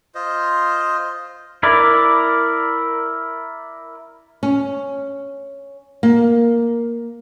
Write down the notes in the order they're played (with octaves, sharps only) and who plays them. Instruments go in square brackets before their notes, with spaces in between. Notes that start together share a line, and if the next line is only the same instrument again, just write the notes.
[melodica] F4 C5 D#5
[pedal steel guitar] E4 A#4 D5
[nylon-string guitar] C#4
A#3